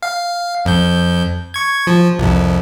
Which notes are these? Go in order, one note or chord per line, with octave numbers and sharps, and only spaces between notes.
F5
F2 G6
C#6 G#6
F3
C2 F2